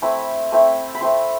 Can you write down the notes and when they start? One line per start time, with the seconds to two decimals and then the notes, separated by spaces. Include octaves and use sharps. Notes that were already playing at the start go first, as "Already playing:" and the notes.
0.02 A3 C4 E4 B5
0.52 A3 C4 E4
0.95 B5
1.01 A3 C4 E4 C6